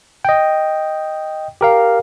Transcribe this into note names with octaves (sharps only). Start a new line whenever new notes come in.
D#5 G5
G4 A#4 F5